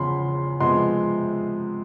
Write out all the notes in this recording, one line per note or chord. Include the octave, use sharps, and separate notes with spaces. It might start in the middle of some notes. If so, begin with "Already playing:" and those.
Already playing: E2 C#3 F3 B5 C6
C3 F3 G#3 B3 C6